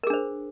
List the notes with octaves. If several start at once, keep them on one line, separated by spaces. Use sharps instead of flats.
D4 G#4 A#4 C5